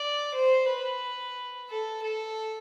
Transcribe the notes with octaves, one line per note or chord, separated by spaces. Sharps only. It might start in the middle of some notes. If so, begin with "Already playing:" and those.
Already playing: D5
C5
B4
A4
A4